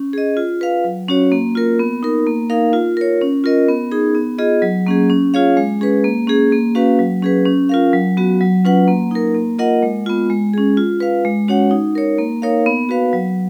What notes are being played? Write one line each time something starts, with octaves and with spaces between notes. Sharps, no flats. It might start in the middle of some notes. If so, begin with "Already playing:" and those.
Already playing: C#4
G#4 D#5
F4
B4 F5
F#3
C#4 F#4 C#5
A#3
F4 A#4
B3
D#4 A#4
A#3
D#4 A#4 F5
F4
A#4 C#5
C#4
F4 A#4 D#5
B3
D#4 G#4
B3
F4 G#4 D#5
F#3
A#3 C#4 G#4
C#4
F4 G#4 C#5 F5
G#3
C#4 G#4 B4
A#3
C#4 G#4
A#3
C#4 F#4 B4 F5
F#3
C#4 G#4 B4
C#4
F4 A#4 F5
F#3
B3 F#4
F#3
C#4 F4 B4 F#5
A#3
D#4 A#4
A#3
F4 A#4 D#5 F#5
G#3
B3 F4
G#3
C#4 G#4
F4
B4 F5
G#3
C#4 F#4 C#5 F#5
D#4
A#4 C#5
A#3
D#4 A#4 C#5 F5
B3
F#4 B4 F5
F#3